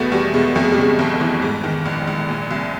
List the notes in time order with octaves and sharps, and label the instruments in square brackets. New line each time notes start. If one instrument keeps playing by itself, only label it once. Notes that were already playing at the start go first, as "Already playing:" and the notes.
Already playing: [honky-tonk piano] E2 B2 A3 B3
E2 G3
B2 G#3
F2 A3
G#3
G3
C#3 G#3
G1
E3
G#2
D#3
A#1
A#1
A#2
C2